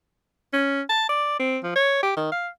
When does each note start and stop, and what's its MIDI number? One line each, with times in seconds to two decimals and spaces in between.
0.53 0.81 61
0.89 1.08 81
1.09 1.39 74
1.40 1.59 60
1.63 1.75 53
1.76 1.99 73
2.03 2.13 67
2.17 2.31 51
2.32 2.48 77